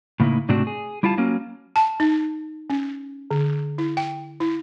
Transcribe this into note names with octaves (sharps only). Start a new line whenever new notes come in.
A2 C#3 A#3 D#4 E4
G#2 C3 A3 C4 D4 F#4
G#4
G3 E4 F4 F5 A5
F#3 A#3 C#4
A5
D#4
C#4
D3
E4
G5
E4